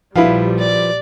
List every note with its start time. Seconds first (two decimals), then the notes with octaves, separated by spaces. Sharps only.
0.16 A#1 F3 G3 E4 F#4 B4 F5
0.59 D5